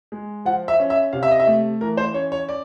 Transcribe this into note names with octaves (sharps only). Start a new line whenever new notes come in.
G#3
F3 F#5
E5
C#4
E5
C3 F5
E5
D#5
E5
A3
E3 A#4
C5
C#4 C#5
C#5
D5